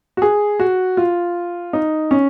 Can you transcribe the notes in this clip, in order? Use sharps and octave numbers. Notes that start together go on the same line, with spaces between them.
F#4
G#4
F#4
F4
D#4
C#4